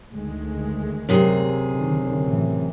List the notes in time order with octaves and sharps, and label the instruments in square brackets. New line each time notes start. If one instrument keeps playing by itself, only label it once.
[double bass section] D2 D#3 G#3
[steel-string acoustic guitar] F#2 C3 G#4
[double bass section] D3 D#3
A1 E3